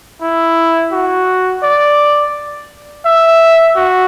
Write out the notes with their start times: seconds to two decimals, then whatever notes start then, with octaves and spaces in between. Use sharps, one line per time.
0.21 E4
0.92 F#4
1.63 D5
3.05 E5
3.76 F#4